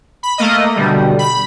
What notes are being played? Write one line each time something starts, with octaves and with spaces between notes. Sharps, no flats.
B5
A3 A#3 D#5
B2 D3 G3
B5